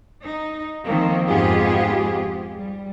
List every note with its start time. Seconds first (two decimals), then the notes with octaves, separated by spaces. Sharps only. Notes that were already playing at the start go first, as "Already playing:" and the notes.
0.24 D#4
0.86 D#3 F3 A#3 C4
1.29 F2 G#2 B3 F4 G4 G#4
2.58 G3